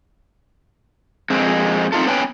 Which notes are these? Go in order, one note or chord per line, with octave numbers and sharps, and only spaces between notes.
F2 G#3 C4
C4 D#4 F4 A4
B3 C#4 B4 G5 G#5